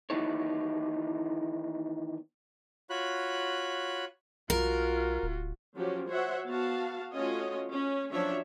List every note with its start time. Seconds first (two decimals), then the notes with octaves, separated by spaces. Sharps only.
0.10 D#3 E3 B3 D#4 E4 C#5
2.90 F4 F#4 C#5 B5 F#6
4.50 B1 F4 F#4 A#4
5.23 D1
5.76 F3 F#3 C#4 F#4 G4
6.09 F#4 C5 C#5 E5 F#5
6.46 B3 F#4 F5 A5
7.13 A3 C#4 F4 F#4 C#5 D#5
7.72 C#4
8.12 F3 F#3 C#4 D4 C#5 E5